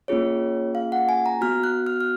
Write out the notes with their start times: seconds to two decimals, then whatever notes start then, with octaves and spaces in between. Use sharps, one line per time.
0.08 A#3 C#4 F4 G#4 C#5
0.75 F5
0.92 F#5
1.09 G#5
1.26 A#5
1.41 B3 F#4 F6
1.64 F#6
1.87 F6
2.00 F6